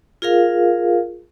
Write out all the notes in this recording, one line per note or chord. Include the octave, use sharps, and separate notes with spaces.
F4 G#4 A#4 F5